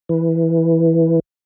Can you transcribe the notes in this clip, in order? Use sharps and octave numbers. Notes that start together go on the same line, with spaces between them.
E3